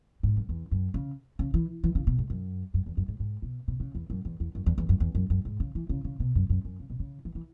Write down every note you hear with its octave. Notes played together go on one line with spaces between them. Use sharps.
G#2
F#2
E2
F#2
C#3
C#3
E3
E3
C#3
B2
G#2
F#2
F#2
E2
F#2
G#2
G#2
B2
B2
C#3
E2
F#2
E2
E2
F#2
E2
E2
F#2
E2
F#2
F#2
G#2
C#3
E3
C#3
C#3
B2
F#2
F#2
F#2
C#3
B2
C#3
E3
E3